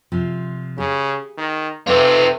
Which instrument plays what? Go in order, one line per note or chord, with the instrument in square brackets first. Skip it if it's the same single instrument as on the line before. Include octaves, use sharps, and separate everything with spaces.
[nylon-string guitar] C3 F3
[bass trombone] C#3 [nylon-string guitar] G4 G#4
[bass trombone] D#3
[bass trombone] C3 [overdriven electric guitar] F4 G4 [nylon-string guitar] A4 C5 E5 [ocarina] B4